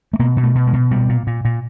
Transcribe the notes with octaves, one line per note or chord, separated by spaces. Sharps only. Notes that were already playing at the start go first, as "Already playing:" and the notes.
A3
B2 A#3
B2
A3
B2
G#3
B2
A#2 G3
A#2
A#2
A#2